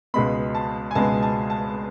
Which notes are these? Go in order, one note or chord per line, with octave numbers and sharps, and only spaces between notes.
C#2 B2 G#3 B3 B5
A5
G#5
C#2 B2 G#3 B3 A5
A5
A5